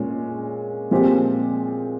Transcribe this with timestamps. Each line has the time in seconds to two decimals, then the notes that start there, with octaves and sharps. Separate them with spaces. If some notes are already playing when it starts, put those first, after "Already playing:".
Already playing: A#2 G#3 C#4
0.91 A#2 F3 G#3 C4 G4